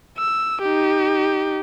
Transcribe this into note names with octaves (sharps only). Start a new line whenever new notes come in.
E6
D#4 G4